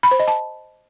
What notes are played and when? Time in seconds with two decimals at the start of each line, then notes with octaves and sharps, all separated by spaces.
0.03 B5
0.11 C5
0.19 D#5
0.28 A5